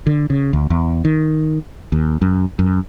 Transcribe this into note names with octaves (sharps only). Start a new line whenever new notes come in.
D3
C#3
D2
E2
D#3
D#2
F#2
F#2